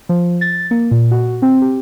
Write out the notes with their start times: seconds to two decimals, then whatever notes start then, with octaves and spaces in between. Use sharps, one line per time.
0.09 F3
0.41 A6
0.71 A#3
0.91 A#2
1.11 F#4
1.42 C4
1.62 G4